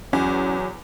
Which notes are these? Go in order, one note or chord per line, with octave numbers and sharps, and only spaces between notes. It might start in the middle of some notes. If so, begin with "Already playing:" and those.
E2 F#3 C#4